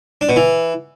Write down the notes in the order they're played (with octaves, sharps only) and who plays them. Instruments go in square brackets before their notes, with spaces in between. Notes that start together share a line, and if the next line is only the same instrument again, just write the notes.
[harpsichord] D4
B2
E3